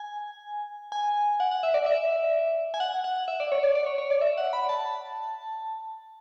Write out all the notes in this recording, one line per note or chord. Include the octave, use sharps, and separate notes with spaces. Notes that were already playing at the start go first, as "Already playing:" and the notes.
Already playing: G#5
G#5
F#5
F#5
E5
D5
E5
G#5
F#5
F#5
E5
D5
C#5
D5
D5
C#5
C#5
D5
E5
F#5
B5
A5